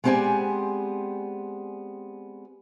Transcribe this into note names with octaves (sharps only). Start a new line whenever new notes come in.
G#3 B3 C4 G4 D5 G#5